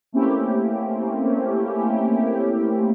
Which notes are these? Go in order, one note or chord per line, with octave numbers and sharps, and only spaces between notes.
A3 A#3 C4 C#4 E4 G4